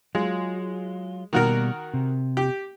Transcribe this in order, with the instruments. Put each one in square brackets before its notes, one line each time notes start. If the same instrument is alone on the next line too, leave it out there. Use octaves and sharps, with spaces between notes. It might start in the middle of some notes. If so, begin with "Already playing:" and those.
[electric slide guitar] F#3 F4 [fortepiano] G#3
[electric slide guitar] B2 G3 A#3 [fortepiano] D#3 F#4 A#4
[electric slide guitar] C3
[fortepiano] G4